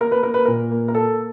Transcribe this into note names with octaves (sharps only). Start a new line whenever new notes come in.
A#3 A#4
B4
A#3 A#4
B4
A#2 A#4
A#3
A#4
A#3 A4